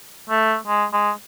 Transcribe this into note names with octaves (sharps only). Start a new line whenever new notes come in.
A3
G#3
G#3